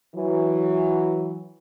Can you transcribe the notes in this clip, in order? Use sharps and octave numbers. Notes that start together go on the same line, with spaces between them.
E3 F#3